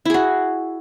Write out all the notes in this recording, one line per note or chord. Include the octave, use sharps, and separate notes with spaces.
E4 F#4 G#4